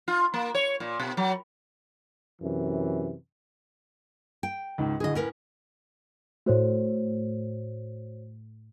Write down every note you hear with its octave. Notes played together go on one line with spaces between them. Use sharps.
F4
A#3
C#5
A#2
B2
F#3
F#2 C3 E3
G5
C#2 G#2
D2 A2 D3 G#4 D#5
A2 C#4 A#4 B4
A2 A3 F#4 C5 C#5